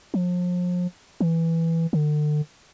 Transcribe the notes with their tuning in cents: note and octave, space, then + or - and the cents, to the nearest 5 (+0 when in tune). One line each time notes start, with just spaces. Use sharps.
F3 +35
E3 +0
D3 +35